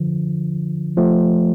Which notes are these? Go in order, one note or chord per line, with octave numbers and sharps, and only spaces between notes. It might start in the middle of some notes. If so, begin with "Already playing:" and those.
Already playing: D3 F3
F3 A3